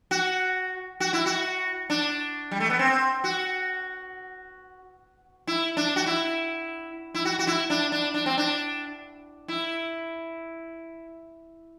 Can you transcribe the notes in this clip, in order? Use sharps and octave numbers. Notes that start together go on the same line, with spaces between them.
F#4
F#4
E4
F#4
D4
G3
A3
B3
C4
F#4
E4
D4
F#4
E4
E4
F#4
F#4
E4
D4
D4
D4
C4
D4
E4